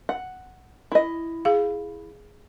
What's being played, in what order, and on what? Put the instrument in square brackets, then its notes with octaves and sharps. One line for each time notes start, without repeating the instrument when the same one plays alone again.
[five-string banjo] F#5
E4 D#5
[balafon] G#4 F5